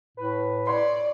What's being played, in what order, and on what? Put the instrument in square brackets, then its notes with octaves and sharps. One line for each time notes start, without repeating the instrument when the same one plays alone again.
[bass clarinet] A2 [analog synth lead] B4
[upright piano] C#5 C6 [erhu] D5